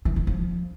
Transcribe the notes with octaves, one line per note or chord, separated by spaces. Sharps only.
E3
D#3
F3